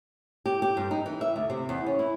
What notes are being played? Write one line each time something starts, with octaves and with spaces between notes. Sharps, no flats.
G4
G4
G2
D#4
E3
E5
D2
C3
E2
C#4
E4